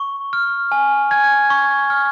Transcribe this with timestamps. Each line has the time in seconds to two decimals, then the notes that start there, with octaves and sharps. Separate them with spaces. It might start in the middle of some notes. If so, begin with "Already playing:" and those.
Already playing: C#6
0.33 F6
0.72 G#5
1.11 G#5 G#6
1.50 C#6
1.90 F6